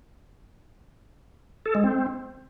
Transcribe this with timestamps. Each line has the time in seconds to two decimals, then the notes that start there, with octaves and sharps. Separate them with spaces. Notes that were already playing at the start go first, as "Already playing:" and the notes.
1.66 A4
1.75 G#3
1.84 C4